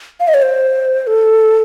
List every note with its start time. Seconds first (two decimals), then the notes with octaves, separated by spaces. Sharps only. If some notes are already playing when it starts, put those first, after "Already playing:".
0.20 F5
0.28 D#5
0.34 C#5
0.42 C5
1.07 A4